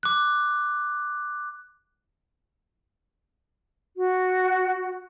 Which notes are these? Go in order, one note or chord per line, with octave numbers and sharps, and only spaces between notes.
D6 F#6
F#4